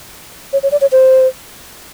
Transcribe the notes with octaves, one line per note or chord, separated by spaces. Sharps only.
C#5
C#5
D5
C#5
C5